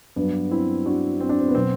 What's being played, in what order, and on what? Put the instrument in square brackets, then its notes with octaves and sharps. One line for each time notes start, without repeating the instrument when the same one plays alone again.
[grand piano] G2 F#3 B3 D4
C4 E4
D4 F#4
C4
D4
C4
B3
B2 F#3 C4